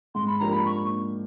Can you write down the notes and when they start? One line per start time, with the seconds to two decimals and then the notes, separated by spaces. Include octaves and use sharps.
0.15 G#2 C6
0.27 B5
0.39 F3 A#3 D4 G4 A#5
0.51 B5
0.66 C#6